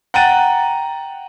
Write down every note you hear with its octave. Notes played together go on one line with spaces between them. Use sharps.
F#5 G5 A#5 F#6 A6 D#7